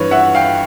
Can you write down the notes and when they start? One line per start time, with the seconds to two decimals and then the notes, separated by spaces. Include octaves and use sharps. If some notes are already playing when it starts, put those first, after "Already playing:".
Already playing: G2 E3 B4 C#5
0.11 E5 F#5
0.35 F5 G5